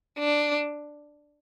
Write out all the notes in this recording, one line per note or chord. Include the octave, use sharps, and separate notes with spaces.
D4